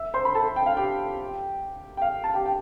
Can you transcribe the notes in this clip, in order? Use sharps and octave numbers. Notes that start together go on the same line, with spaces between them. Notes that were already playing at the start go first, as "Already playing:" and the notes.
Already playing: E5 E6
C5 C6
B5
A4 A5
G5
F5
G4 G5
G5
F5
A5
G4 G5
G5